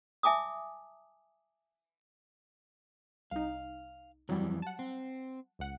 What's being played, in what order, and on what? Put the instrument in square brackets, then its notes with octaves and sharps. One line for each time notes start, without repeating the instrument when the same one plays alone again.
[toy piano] E5 G#5 A5 D6 D#6
[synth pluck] C2 D#4 [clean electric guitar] F5
[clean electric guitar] F2 E3 [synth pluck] F#3 G3
[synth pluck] F#5 A5
[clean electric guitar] C4
[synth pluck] C#2 F#5 C#7